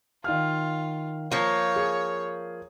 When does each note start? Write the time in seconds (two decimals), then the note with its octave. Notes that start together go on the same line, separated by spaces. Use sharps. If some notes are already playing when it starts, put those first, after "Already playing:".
0.24 D#3 F4 F5 F6
1.31 F3 A#3 C#5
1.76 G#4